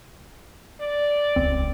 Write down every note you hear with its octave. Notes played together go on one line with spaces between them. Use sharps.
D5
D#1 C#2 C4